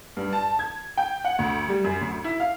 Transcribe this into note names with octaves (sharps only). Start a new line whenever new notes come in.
G2
A5
G#6
G5
F#5
D2
G3
F#2
D2
E4
F5